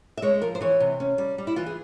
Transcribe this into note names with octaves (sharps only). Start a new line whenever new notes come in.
E5
G#3 C#5
F3 A#4
C5
E3 C#5
C3
C#4
G3
G3
E4
E3 F4
G#4